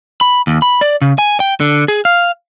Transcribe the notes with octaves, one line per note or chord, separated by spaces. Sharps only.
B5
D#2
B5
D5
C#3
G#5
G5
D3
G#4
F5